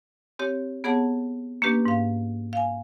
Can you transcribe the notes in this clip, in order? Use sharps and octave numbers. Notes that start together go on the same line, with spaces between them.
C4 G4 C#5
B3 G#4 C#5 F#5 A5
A#3 C#4 D4 G4 B4
G#2 F5
F5 G#5